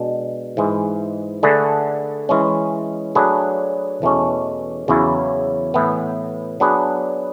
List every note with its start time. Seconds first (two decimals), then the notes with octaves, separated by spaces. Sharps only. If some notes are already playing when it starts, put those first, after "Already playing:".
Already playing: B2 G#3 D4
0.57 G#2 E3 G#3
1.43 D3 A3 D4 G#4 B4
2.29 E3 G#3 C#4
3.15 F#3 A3 D4 G#4 B4
4.02 E2 B2 A3 C#4
4.88 E2 C#3 F#3 C#4 E4
5.74 A2 E3 B3
6.60 F#3 B3 D4 G#4 B4